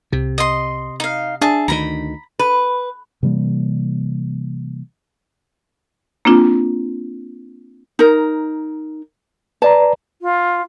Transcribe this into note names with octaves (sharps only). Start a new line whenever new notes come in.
C2 C3
D#5 C6
D#4 F5
D4 G#4 E5 A5
D2 D#3 A#5 B5
B4
C3 E3 G3 A#3
A#3 C4 D4 F4
D#4 A#4
B4 D5 A5 A#5
F4